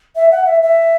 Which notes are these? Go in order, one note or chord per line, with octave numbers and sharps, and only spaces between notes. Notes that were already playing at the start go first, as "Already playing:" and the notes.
E5
F#5
E5
E5